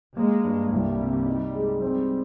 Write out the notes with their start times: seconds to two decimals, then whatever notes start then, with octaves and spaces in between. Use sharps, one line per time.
0.17 G#3 A#3
0.44 G2
0.71 C2 G3
0.99 C3
1.26 D#4
1.54 G#3
1.81 G3 C4